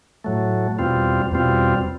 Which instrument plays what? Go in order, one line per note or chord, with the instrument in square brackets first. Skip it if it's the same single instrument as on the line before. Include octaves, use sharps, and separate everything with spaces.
[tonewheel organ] A2 F#3 A3
E2 B2 G3 C4 F4
E2 B2 G3 C4 F4